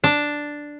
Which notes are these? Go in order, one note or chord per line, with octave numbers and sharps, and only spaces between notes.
D4